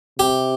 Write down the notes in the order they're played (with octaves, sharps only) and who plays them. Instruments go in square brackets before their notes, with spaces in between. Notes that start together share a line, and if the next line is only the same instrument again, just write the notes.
[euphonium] C3 [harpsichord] G4